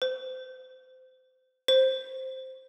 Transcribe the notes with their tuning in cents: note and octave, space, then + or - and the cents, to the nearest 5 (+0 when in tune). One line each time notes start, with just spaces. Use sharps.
C5 -25
C5 +0